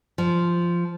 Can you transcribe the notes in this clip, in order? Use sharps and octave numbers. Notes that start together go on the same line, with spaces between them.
F3